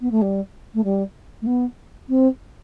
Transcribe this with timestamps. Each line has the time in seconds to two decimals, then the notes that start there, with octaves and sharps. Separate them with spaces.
0.01 B3
0.11 A3
0.22 G3
0.74 A3
0.84 G3
1.42 A3
1.46 B3
2.09 C4